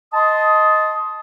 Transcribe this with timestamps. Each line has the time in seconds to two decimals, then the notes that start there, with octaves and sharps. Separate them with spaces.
0.13 D#5 A5 C6 D#6